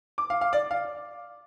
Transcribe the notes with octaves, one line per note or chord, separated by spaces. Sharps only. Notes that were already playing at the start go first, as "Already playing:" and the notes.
D6
F5
F5
D5
F5